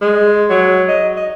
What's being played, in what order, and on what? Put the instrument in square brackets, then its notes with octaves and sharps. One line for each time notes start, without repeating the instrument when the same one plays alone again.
[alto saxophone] G#3
F#3
D#5
D#5